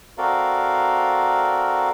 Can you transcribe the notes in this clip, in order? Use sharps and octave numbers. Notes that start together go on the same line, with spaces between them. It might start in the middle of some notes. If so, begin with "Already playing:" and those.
C4 F#4 A4 A#4 D5 F5